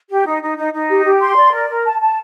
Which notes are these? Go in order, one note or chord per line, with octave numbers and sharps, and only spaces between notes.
G4
D#4
D#4
D#4
D#4
G4
G4
C6
D5
A#4
A#4
A5
A5